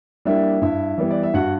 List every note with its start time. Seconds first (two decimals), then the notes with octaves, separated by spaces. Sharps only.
0.25 G3 A#3 D4 E4 E5
0.62 G2 E4 E5
0.98 E3 G3 B3
1.11 D5
1.23 E5
1.34 G2 F#4 F#5